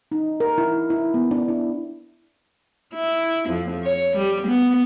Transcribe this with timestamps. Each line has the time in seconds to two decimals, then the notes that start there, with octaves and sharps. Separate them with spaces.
0.12 D#4
0.40 A#4
0.58 E4
0.90 E4
1.14 B3
1.31 D4
1.48 E4
2.94 E4
3.50 F2
3.84 C#5
4.17 G3
4.47 B3